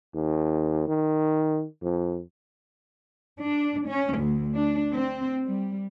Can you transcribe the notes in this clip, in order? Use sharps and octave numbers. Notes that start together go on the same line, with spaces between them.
D#2
D#3
F2
D4
C#4
D2
D4
C4
G3